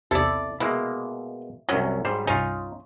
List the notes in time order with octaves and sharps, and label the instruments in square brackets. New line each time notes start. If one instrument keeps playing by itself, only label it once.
[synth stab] B1 E2 C3 [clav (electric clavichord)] E4 [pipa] A4 D5
[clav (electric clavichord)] B2 G#3 A#3 [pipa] E4
[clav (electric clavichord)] C2 F#2 C#4 [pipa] F#3
[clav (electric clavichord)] G#2 G3 C5
[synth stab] C2 G2 [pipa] C#4 [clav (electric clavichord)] D#4 F4